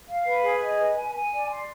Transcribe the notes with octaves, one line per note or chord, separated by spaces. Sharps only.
F5
B4
G#4
D#5
B4
G#5
G#5
D5
C6